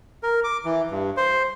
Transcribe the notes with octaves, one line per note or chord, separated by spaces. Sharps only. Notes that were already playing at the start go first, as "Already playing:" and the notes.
A#4
D6
E3
G2
C5